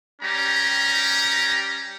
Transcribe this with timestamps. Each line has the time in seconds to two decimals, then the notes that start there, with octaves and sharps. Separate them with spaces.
0.22 G3 C#4 G4 A#5